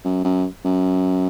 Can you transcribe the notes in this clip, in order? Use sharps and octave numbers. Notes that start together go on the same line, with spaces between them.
F#2
F#2
F#2